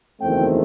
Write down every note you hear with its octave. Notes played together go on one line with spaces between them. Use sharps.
F#1 E2 D#3 A3 C4 G5